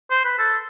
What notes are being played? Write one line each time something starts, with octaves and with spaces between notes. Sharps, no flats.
C5
B4
A4